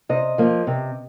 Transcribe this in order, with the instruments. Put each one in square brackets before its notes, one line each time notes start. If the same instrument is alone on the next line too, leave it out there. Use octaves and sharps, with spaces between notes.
[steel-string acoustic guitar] C3 D#5
F3 A#3
C3